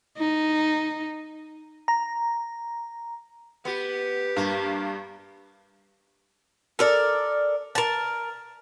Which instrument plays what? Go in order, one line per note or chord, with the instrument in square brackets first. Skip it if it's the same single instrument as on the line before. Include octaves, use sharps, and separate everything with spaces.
[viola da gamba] D#4
[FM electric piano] A#5
[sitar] B3 [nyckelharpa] G4
[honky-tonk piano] G2 [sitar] A#3
[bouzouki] A4 A#4 D5
A#4 A5